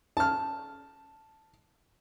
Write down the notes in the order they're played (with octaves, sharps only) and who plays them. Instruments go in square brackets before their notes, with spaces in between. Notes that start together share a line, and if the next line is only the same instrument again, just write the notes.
[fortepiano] A5 F6